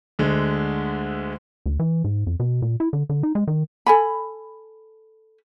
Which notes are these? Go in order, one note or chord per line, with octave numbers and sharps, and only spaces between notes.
D2 D3 G#3
D2
E3
G#2
F2
B2
A#2
E4
D3
D3
D#4
G#3
D#3
A4 G#5 B5